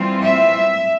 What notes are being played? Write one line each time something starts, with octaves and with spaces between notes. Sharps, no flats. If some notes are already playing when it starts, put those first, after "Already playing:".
Already playing: E3 G3 C4 F4
E5